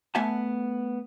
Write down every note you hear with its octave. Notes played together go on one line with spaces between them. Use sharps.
A3 B3 E5 F#5 G#5 A5